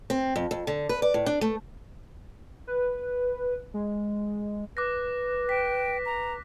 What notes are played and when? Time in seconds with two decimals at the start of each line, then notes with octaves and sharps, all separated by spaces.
0.10 C4
0.36 F2
0.51 F2
0.67 D3
0.89 B4
1.02 D5
1.14 A2
1.26 D4
1.41 A3
2.67 B4
3.74 G#3
4.77 B4 D6 F#6 A#6
5.49 G5 B6
6.06 A#5